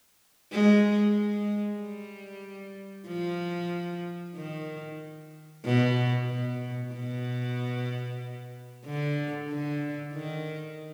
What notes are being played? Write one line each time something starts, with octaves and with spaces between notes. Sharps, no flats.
G#3
G#3
G3
F3
D#3
B2
B2
B2
D3
D3
D#3